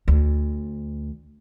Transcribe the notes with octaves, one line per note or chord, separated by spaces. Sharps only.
D2